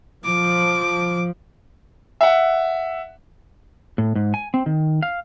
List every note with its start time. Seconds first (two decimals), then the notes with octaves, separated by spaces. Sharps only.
0.25 F3 D6
2.21 E5 F#5
3.98 A2
4.16 G#2
4.34 G#5
4.54 C4
4.66 D#3
5.03 F5